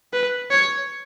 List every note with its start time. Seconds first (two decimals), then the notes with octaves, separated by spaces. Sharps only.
0.13 B4
0.51 C#5